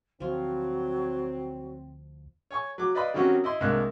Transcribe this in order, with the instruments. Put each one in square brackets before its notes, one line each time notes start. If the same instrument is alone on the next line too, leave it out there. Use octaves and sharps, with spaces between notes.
[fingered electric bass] D2 [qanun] F3 F4 [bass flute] F#3 [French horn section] C4
[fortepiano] C#5 G#5 C#6
F#3 D6
B4 D5 D#5 F5 B5
D#3 F#3 G3 C4 C#4 F#4
E4 D#5 C6
C2 G#3 A#3 D4 F#6